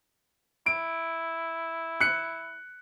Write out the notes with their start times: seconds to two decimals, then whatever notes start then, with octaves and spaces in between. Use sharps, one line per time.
0.66 E4 D7
2.01 F#6 C#7